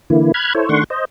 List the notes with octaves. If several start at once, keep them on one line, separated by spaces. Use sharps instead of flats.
D3 E3 A#3 E4
B5 F6 F#6 G#6
E4 A4 C5 C#5
D#3 A3 D4 F#5 C6 C#6
C5 D#5